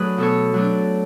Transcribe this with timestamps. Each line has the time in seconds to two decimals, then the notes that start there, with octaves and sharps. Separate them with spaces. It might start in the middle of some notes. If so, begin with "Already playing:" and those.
Already playing: F#3 A3 D4 G#4 B4
0.18 B2 A4 C#5
0.54 F#3 A3 D4